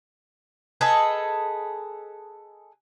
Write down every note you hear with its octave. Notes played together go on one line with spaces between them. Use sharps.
G#4 A4 B4 D#5